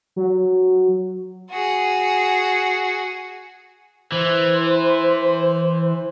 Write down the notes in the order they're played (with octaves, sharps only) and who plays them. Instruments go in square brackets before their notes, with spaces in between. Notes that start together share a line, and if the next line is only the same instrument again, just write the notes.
[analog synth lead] F#3
[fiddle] F#4 G#4
[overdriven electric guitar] E3 [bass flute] C5